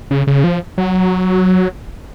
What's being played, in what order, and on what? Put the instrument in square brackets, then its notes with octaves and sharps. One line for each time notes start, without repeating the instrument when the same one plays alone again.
[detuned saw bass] C#3
C#3
F3
F#3